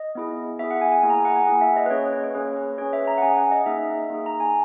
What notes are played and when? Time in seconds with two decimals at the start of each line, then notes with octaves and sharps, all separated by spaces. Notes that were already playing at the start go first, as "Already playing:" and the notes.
Already playing: D#5
0.15 B3 E4 G#4
0.59 B3 E4 G#4 E5
0.71 F#5
0.81 G#5
0.92 G#5
1.03 A#3 E4 G#4 G#5
1.10 A#5
1.14 G#5
1.25 F#5
1.36 G#5
1.47 A#3 E4 G#4 F#5
1.61 E5
1.76 D#5
1.86 B4
1.90 A#3 C#4 G#4 C#5
2.13 C#5
2.24 C#5
2.35 A#3 C#4 G#4 B4
2.56 B4
2.78 C#4 G#4 C#5
2.93 E5
3.07 A#5
3.18 F#5
3.22 C#4 G#4 G#5
3.37 F#5
3.51 D#5
3.66 A#3 D#4 G#4 E5
4.10 A#3 D#4 G#4
4.26 A#5
4.40 G#5